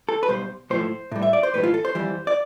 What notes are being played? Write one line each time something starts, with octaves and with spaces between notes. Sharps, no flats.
A4
B4
B1 B2 G3 C5
B1 A2 F3 A3 C5
A2 G3
E5
D5
C5
B1 A2 E3 G3 B4
F4
A4
C5
F2 E3 G3
D5